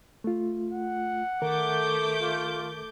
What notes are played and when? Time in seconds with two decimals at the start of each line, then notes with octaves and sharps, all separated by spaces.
0.24 A3 F4
0.72 F#5
1.42 D#3 A3 A#4 D6 G6
2.21 F4